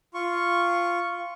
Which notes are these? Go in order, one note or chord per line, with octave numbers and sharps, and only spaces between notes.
F4 C#6